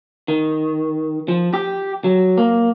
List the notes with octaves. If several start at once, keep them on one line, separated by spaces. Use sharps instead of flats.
D#3
F3
G4
F#3
A#3